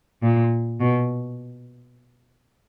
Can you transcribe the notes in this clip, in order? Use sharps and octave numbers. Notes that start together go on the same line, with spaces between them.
A#2
B2